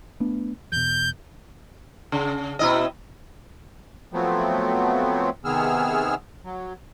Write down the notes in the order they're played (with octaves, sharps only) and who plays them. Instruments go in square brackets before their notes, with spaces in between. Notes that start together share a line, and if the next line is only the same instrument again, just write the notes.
[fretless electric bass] A3 B3 D4
[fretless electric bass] E2 B2 [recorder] G6
[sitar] C#3
B2 E4 D#5
[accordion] F3 F#3 A3 B3 C4
C3 D#3 B3 G#4 E6 F6
F#3